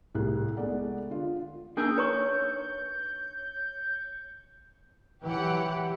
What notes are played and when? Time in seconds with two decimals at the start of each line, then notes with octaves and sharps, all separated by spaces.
0.15 C2 A2 G#4 F#6
0.57 G#3 A3 B3 D5 F#5
1.10 D3 F4
1.77 A#3 D4 D#4 G#4 A#4 E6 G6
1.98 B4 C#5 A#5 C#6
5.25 E3 F#3 G4 F#5